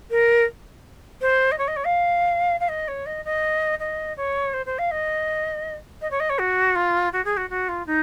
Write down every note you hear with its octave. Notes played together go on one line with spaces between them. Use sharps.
A#4
C5
D#5
C#5
D#5
C#5
F5
F5
D#5
C#5
D#5
D#5
D#5
C#5
C5
C5
F5
D#5
D#5
C#5
D#5
C#5
F#4
F4
F#4
G#4
F#4
F#4
F4
D#4